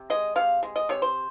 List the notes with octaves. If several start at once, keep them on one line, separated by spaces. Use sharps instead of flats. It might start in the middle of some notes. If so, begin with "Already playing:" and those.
Already playing: C3
G#3 D#5
C3 F5
G#3
D#5
C3 C#5
C5